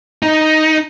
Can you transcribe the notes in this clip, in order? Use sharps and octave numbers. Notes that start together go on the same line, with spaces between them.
D#4